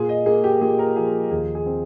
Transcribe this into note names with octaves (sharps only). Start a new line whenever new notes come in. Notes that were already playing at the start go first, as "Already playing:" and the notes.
Already playing: A#2 G#4
D#5
A#3 G#4
G4
A#2 G#4
A#4
F3 G#4
D#2 G#4
G#4
C4